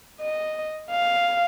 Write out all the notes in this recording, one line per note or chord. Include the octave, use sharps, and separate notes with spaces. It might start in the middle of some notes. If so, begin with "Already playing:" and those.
D#5
F5